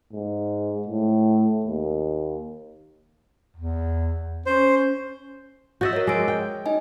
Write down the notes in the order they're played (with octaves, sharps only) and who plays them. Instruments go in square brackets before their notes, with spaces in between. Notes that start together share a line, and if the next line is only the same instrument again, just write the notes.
[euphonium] G#2
A2
D#2
[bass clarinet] E2
[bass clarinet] C#4 [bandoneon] C5
[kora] F#4 D#5 E5 [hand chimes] G6 A6
[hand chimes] A#4 C#5
[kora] G#3 [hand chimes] C#5 D6 D7
[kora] G5
[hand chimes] D#4 D#5 G#5